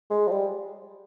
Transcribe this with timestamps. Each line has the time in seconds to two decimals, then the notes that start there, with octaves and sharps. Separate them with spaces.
0.10 G#3
0.27 F3
0.31 G3